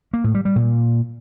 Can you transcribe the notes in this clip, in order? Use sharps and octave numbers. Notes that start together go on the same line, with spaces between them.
A#3
A2
G3
G3
A#2